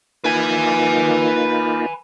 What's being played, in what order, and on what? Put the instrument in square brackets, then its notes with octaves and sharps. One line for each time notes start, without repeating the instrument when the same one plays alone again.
[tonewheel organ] A#3 D#4 F4 [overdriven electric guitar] B4 G#5